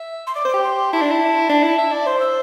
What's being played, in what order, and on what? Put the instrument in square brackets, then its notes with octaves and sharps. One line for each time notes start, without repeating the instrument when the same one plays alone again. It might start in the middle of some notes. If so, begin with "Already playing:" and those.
Already playing: [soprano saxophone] E5
[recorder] C6
[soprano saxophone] D5 [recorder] D6
[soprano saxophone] C5
[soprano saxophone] G4 [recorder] D6
[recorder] C6
[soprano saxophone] E4 [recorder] A5
[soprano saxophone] D4
E4
D4
E4
E5
D5
[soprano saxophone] C5 [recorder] C6
[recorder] E6